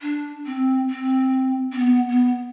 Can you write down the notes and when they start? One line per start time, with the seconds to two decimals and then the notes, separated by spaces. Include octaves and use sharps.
0.02 D4
0.46 C4
0.90 C4
1.72 C4
1.78 B3
2.08 B3